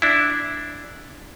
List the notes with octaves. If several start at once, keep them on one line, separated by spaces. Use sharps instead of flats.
D4 E4